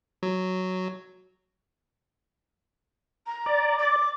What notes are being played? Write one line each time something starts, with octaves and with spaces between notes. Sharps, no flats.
F#3
A#5
D5
D6